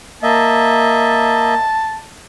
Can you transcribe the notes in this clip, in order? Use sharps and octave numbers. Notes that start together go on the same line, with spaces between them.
A#3 D#5 E5 A5